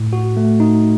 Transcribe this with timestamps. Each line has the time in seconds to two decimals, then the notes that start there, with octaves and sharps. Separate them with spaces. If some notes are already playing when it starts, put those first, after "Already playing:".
Already playing: A2
0.13 F#4
0.37 A3
0.60 D#4